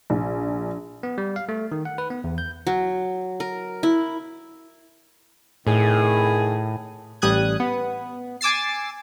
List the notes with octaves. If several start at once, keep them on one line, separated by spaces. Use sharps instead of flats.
A#1
B3
G3
F5
A3
D#3
F#5
B4
B3
E2
G6
F#3
A#4
E4
A2 C3 D#3 G#4
A1 G3 D#6 F#6 G#6
B3
G#5 D6 E6 A6 C7